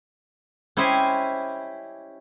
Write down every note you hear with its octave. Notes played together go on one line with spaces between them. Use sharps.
C#4 E4 G4 C5 D#5 G#5